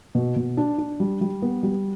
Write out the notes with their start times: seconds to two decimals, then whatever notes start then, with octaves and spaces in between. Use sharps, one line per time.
0.15 B2
0.36 B2
0.57 D4
0.78 D4
1.00 G3
1.21 G3
1.42 B3
1.63 G3